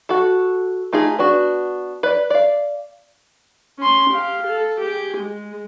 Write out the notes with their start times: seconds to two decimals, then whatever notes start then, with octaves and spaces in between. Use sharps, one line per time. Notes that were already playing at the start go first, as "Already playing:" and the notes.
0.09 F#4 A4
0.93 A3 D#4 F4 G#4
1.19 B3 D4 F#4
2.03 B4 D5
2.30 D5 F5
3.79 C#4 C6
4.10 G4 F5
4.47 A4
4.81 G4 G#4
5.17 G#3